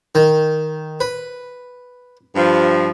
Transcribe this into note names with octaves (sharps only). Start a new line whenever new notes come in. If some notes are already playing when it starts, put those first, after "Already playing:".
D#3
B4
G2 F3